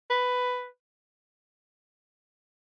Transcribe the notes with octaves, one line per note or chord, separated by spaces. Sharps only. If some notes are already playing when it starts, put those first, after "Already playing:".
B4